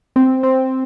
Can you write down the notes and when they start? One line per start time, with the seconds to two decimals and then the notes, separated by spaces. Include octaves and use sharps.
0.16 C4
0.43 C4